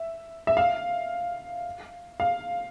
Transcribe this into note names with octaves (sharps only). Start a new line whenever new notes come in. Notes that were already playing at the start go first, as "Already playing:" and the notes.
Already playing: E5
E5
F5
F5